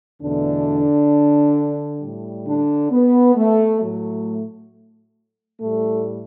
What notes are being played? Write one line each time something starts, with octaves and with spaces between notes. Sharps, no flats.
E2 B2 D3 A3 D4
A2 G3
D3 D4
B3
A3
A2 F#3 A3
A2 G3 A3